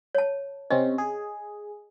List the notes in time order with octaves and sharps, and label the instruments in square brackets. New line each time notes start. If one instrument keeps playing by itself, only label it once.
[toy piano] C#5 A5
[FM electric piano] C3 C4 C#4 [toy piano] D#5
[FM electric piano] G#4